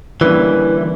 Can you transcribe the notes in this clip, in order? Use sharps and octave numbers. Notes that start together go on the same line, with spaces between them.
D3 E3 G3 A#3 C#4 E4